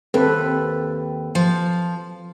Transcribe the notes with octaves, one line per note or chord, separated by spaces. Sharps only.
D#2 C4 A4 B4
F3